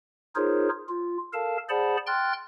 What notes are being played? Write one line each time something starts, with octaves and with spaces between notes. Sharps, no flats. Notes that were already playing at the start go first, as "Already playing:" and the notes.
D#4 F4 G#4 A#4 C5 C#5
F4
A4 A#4 F5 A5
G#4 C5 D5 F#5 A5 B5
G5 C6 F6 F#6 A6